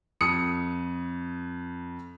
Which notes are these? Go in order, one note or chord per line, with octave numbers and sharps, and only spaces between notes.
F2 D#6 C#7